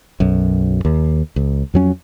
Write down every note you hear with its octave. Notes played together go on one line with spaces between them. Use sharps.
B1 F#2
D#2
C#2
F2 F#3 C#4